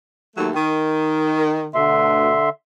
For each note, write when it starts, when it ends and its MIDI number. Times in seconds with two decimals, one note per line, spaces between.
0.36 0.49 39
0.36 0.49 54
0.36 0.49 57
0.53 1.69 51
1.75 2.37 38
1.75 2.37 47
1.75 2.49 50
1.75 2.49 76
1.75 2.49 84